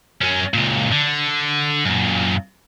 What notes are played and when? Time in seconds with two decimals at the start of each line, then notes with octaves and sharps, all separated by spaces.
0.21 F#2 C#4
0.54 C#2 A#2
0.92 D3
1.85 F#2 A#2